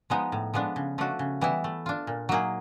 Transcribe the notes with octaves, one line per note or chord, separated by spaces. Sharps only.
F3 G#3 B3 D#4
A2
F3 G#3 B3 D4
C#3
F3 A3 D4 F#4
C#3
E3 G3 B3 E4
A3
D4 F4
A#2
F#3 A#3 D#4 G#4